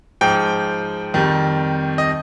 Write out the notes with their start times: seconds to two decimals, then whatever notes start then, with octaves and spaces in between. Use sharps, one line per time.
0.21 G#2 F3 G5
1.14 F2 D#3 G3
1.98 D#5